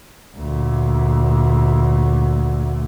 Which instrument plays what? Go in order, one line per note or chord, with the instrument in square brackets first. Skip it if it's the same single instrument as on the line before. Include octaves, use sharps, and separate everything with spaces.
[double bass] D2 A#2